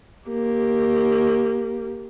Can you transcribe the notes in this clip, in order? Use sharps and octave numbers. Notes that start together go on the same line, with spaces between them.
A#3 G4